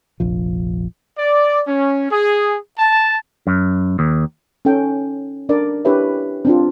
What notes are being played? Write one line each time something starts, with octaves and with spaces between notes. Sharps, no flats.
F1 A#1 F3
D5
C#4
G#4
A5
F#2
D#2
C#4 D#4 A4 G5
D4 A#4 D5
D4 E4 G4 B4 C#5 E5
C4 D4 F4